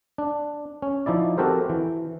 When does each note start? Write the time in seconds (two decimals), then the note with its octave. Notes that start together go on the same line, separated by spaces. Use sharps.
0.18 D4
0.82 C#4
1.06 F3 D#4 E4 D5
1.38 C4 F#4 G4 A4 A#4 C5
1.69 E3